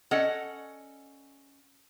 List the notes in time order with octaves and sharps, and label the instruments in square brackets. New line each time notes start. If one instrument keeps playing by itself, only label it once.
[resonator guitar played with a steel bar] C#4 A4 D5 D#5 F#5